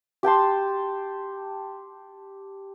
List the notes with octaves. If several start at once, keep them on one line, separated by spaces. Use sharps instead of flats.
G4 G5 A5 C6